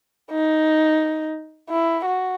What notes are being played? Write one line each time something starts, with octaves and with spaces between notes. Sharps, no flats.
D#4
E4
F#4